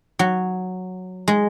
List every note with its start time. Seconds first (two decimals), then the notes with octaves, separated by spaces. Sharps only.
0.19 F#3
1.28 G#3